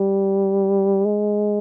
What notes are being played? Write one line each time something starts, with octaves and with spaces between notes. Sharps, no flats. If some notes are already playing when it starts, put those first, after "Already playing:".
Already playing: G3
G#3